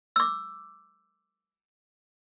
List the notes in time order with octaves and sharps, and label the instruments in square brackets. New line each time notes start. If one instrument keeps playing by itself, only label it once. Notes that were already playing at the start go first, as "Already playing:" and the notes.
[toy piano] D6 E6